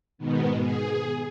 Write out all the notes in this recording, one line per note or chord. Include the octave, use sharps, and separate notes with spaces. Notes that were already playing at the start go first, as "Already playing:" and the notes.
G#2 B2 D#3 B3
G#4